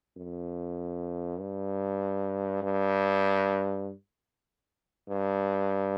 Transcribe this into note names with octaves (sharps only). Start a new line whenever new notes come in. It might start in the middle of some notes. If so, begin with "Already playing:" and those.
F2
G2
G2
G2